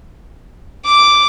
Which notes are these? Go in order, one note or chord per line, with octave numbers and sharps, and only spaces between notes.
D6